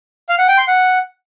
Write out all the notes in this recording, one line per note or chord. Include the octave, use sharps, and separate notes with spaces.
F5
F#5
G5
C6
F#5